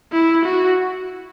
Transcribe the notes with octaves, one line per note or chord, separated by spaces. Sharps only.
E4
F#4